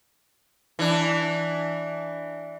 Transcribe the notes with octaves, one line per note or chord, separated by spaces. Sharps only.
E3 D4